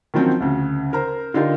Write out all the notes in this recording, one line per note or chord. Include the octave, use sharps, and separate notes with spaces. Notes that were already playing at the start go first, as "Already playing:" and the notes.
D#3 F3 F#3 C4 C#4
D2 C#3
A#4 C5 A#5
D3 D#4 F4 G4 A#4